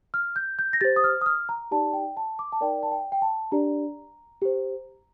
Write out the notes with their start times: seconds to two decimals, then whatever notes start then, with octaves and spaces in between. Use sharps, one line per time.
0.14 F6
0.36 G6
0.59 G6
0.73 A#6
0.81 G4 C5 A6
0.96 D#6
1.04 F6
1.21 D#6
1.26 F6
1.49 A#5
1.71 D#4 G4 D5 A5
1.93 G5
2.17 A5
2.39 D6
2.52 A5
2.61 D#4 A#4 D5 G5
2.83 A5
2.92 G5
3.12 G5
3.22 A5
3.52 D4 G4 D5 A#5
4.42 G4 C5